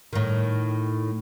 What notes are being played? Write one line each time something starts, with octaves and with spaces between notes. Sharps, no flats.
A2 D#3